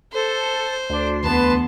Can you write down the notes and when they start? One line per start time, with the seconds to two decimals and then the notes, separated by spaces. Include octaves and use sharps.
0.13 A4 C5
0.90 D2 D4 C6
1.24 E2 B3 B4 A5